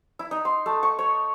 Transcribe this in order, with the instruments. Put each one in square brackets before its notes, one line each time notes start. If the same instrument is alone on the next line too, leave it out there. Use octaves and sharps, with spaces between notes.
[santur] E4
D#4
C6
A3
C#6
C#5